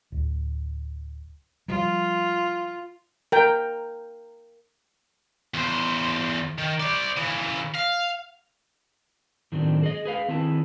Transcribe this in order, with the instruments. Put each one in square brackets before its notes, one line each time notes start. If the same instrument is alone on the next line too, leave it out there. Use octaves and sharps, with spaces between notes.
[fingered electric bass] D1
[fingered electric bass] F3 G3 [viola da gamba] F4
[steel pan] A#4 G5
[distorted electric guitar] E2 C5
D#3
C5 D5
C#3 E3
F5
[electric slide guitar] A2 D#3 F#3 C4 D4
G#4 D#5
G#4 B4 F5
D#3 C4 E4 G#4 B4 A5